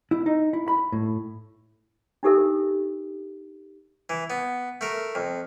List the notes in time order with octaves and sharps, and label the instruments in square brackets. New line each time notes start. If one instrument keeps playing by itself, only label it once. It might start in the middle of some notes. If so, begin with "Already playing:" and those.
[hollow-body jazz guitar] E4
D#4
E4
B5
A2
[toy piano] D4 D#4 G4 A4 A#4 E5
[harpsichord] E3
B3
A3 A#4
F2